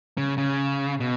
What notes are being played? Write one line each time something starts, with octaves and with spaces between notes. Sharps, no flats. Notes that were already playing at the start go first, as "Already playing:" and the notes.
C#3
C#3
B2